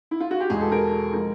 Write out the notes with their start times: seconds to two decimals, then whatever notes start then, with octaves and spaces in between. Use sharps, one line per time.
0.11 E4
0.20 F4
0.31 F#4
0.40 G4
0.49 E2 B2 G#3 G#4
0.60 A4
0.72 A#4
1.13 F3 G#3 A#4